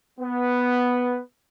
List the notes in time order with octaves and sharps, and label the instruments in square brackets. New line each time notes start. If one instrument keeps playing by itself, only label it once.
[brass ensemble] B3